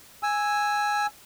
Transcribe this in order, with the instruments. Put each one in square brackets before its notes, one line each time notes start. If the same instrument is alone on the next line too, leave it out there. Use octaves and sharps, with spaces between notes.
[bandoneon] G#5 E6